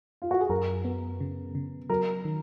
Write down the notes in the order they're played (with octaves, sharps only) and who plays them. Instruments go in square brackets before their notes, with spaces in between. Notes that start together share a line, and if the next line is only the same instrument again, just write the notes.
[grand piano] F4
F#4
G#4
[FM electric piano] F#2 [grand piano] A#4
[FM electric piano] B3
C#3
C#3
[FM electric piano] F#3 [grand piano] A#4
[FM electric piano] D#3